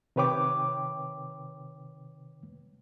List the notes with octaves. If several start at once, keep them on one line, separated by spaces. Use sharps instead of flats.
C3 D#3 B4 C#5 G5 D6